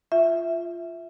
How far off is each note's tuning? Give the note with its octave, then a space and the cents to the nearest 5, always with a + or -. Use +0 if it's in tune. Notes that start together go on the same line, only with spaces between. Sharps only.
F4 -10 E5 +0